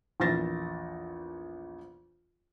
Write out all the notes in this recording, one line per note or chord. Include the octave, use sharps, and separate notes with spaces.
A#1 E2 E3 A6 A#6